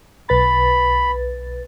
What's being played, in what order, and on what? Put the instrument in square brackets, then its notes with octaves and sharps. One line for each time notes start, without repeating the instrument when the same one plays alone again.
[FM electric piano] B1 B4 A6 [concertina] B5